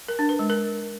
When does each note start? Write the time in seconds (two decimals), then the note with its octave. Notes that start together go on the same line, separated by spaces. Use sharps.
0.08 A#4
0.19 D4
0.29 B4
0.39 G#3
0.50 A#4